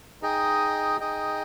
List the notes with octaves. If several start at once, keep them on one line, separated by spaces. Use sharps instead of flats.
D#4 G#4 D#5 G5
D#4 G#4 D#5 G5